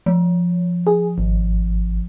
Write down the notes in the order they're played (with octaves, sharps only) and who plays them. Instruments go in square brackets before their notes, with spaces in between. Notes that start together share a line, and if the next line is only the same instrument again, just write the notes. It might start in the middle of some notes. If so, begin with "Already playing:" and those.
[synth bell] F3
[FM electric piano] G#4
G#1